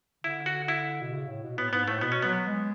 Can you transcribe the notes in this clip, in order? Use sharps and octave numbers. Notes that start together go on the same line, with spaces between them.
D3 E4
F#4
E4
B2
C#3
A2
B2
A2 B3
G#2 B3
A2 A3
B2 B3
C#4
F#3 B3
G#3